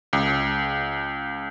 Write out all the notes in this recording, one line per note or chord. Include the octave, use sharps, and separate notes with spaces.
C#2